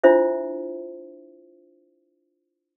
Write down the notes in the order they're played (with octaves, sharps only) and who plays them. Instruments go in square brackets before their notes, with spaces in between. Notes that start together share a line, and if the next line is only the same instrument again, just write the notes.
[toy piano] D4 E4 F4 C5 E5